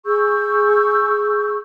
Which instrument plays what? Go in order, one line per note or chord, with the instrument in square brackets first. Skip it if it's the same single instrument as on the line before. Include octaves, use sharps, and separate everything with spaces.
[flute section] G#4 C#6 E6 G6